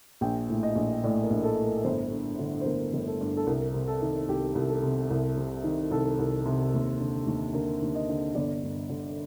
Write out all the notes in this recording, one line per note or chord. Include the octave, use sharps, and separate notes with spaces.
A#1 G5
A2
D#5
A#1
A2 D5
A#4
A#1
A4
A2
A#4
G1 C5
G2
D3
C5
G1 A#4
G1
A4
G2
A4
C2 A#4
C3
A4
D#3
C2 G4
C2
A4
C3
C2
C3
D#3
C2 A4
C2
C3
D#2
D3
D#2
D3 A#4
D#2
D#5
D3
G1 D5
G2
D3